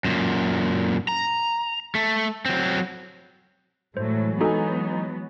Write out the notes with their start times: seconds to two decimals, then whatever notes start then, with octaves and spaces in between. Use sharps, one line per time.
0.04 F#2 A#2
1.08 A#5
1.95 A3
2.46 F#3 C4
3.97 A2 E3 F#3 G#3 C5
4.41 F#3 B3 D#4 F#4 A4 G#5